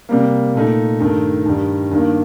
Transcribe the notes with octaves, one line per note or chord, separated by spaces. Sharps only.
C3 G3 A#3
A#2 A3 D#4
G2 D#3 A3
G2 D#3 G3
G2 D#3 A#3